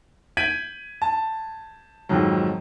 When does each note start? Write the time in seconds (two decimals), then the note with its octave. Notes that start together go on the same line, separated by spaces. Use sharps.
0.37 G6 G#6 B6 D7 D#7 F#7
1.02 A5
2.09 F2 G#2 D#3 F#3